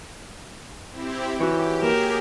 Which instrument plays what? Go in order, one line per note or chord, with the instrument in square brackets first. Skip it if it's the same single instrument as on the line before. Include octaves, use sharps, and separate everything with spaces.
[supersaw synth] C4 E4 G4
[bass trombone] E3 [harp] F#4 C#5 [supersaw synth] G4
[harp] A#3 E7 [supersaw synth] G4 G#4 [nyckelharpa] A#4